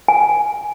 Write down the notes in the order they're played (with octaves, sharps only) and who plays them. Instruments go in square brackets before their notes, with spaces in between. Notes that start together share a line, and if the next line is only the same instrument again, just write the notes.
[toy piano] G#5